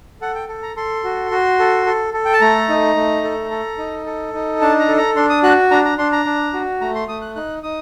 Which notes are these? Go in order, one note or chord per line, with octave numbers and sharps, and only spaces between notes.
A4 F#5
G5
A4
A#5
A4 C6
F#4
F#4
A4
A4
A4
G5
A5
A3 A#5
D#4
A3
A4
A4
D#4
A4
D#4
D4 A5
A#5
A4
A#5
D4 C6
D#6
F#4 F#6
D4 A#5
A#5
D4 C6
A#5
D4
F#4
A3 A#5
C6
A3 D#6
F#6
D#4 F#6
D#4 D#6